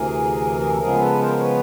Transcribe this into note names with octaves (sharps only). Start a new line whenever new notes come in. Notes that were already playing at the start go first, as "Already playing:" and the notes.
Already playing: D2 C3 E3 G#4 A#4
G#4
A4
C#3 F3 G#3 B3 G#4 A#4
A4 B4
A#4 C5
B4 C#5